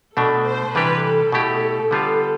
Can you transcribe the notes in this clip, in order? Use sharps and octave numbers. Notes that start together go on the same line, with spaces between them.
B2 A3 D4 A4
C5
C3 E3 G3 D4 G4 B4
A4
B2 A3 E4 G4
D3 G3 B3 F4 A4